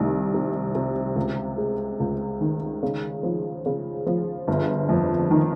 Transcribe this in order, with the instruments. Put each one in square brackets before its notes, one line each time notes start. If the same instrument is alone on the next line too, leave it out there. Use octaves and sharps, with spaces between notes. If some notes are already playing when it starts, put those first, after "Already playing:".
Already playing: [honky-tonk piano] C2 D#3
C3
C3
C#2
G#3
C#2
D#3
C#3
F3
C#3
F3
G1
F2
D#3